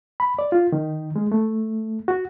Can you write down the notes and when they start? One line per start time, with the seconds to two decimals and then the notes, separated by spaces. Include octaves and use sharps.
0.20 B5
0.39 D5
0.52 F4
0.72 D#3
1.16 G#3
1.32 A3
2.08 F#4